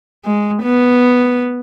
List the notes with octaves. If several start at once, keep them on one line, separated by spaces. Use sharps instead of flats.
G#3
B3